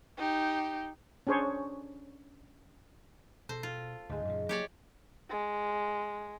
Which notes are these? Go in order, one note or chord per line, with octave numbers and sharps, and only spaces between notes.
D#4 G4
C#4 D4 G#4 C5 C#5
B2 A4 C5
F4 G5 D#6
D2 G#2 G#3 D#4
F#2 A#2 C#3
F#3 A#3 G4 G#4 C#5 D5
G#3